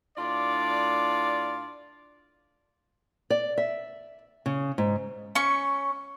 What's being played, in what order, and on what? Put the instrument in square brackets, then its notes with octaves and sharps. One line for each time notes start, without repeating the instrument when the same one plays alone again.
[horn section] A2 D4 F4 D5
[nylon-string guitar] D5
E5
C#3
G#2
[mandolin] C#4 C#6